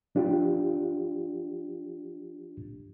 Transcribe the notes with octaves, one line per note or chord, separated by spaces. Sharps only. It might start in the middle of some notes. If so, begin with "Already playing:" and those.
F3 D4 F4 G4